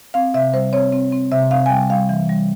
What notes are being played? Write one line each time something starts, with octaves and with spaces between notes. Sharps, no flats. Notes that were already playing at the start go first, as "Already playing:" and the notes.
C4 F5
C3 E5
G3 C5
C4 C#5
C4
C4
C3 E5
C4 F5
G#5
G3 G5
G3 F5
E3
G3